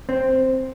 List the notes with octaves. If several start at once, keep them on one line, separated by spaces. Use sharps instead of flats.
C4